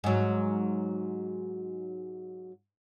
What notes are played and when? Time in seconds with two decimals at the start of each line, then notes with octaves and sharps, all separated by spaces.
0.04 G#2 F#3